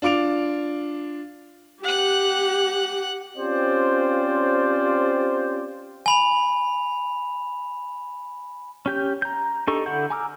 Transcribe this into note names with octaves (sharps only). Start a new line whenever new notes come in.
D4 F4 D6 D7 F7
G4 F#5 F#6
C4 C#4 F4 G4 C5 D5
G#5 B5 F7
C#4 G4 G6
A#5 G6
D4 D#4 G4 A4 C#6
D3 E4 A4 F#5 G6
G#5 A#5 D6 E6 F6